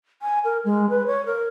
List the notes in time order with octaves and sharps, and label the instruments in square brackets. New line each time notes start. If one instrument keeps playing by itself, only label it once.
[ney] G#5
A#4
G#3
B4
C#5
A#4